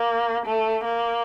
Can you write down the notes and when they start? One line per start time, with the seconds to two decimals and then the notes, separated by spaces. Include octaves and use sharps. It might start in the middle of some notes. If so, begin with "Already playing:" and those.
Already playing: A#3
0.46 A3
0.84 A#3